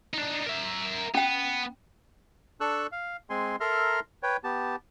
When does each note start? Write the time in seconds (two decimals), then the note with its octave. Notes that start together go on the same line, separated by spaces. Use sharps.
0.14 D4 D#4
0.46 A#4 E5
1.15 B3 C#4 G5
2.61 D4 A4 C#6 E6 F#6
2.92 F5
3.30 G#3 C4 G#5 C6
3.60 A4 A#4 E5 A#5 C6 F6
4.23 B4 C#5 G5
4.44 B3 G4 A5